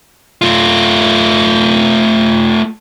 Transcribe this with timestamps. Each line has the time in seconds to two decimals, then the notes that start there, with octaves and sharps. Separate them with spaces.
0.42 A3 F4